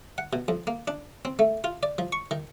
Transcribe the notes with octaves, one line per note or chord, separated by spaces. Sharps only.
F#5
B2
F2
A#3
D4
C4
A3
F4
D5
F3
C#6
D#3